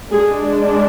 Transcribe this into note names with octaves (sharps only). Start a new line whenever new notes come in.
G#3 D4 G#4